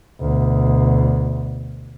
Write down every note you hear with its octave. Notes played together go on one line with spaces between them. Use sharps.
D2 B2